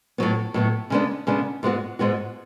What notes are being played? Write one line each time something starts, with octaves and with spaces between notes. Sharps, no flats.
A2 F#3 B3
A2 F#3 B3
C#3 G#3 B3 D4
C#3 G#3 B3 D4
G#2 G#3 B3 F#4
G#2 G#3 B3 F#4